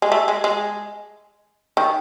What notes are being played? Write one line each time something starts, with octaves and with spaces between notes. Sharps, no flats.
G#3
A3
G#3
G#3
D#3